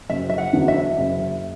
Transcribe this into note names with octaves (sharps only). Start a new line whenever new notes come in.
F#1 E5
E5
F#5
E2 D3 F#3
E5
F#1